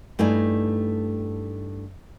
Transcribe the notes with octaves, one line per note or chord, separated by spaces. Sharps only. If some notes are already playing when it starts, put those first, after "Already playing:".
G2 A3 D#4 E4 G#5